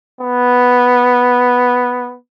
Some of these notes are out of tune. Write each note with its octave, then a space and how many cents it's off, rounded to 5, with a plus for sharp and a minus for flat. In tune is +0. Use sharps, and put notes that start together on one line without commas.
B3 +0